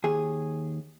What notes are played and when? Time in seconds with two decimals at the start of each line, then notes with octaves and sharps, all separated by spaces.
0.04 D#2 G#4